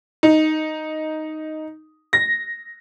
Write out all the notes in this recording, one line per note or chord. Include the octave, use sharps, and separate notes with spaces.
D#4
A#6